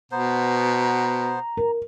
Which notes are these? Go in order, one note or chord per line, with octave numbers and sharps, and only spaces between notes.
B2 B3 C5 A#5
A#4